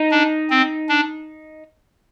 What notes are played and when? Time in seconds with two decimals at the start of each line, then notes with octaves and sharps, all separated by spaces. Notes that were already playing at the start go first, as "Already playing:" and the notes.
Already playing: D#4
0.11 D4
0.50 C4
0.89 D4